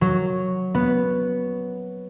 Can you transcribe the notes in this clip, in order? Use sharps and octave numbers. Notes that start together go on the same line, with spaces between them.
F#3
B3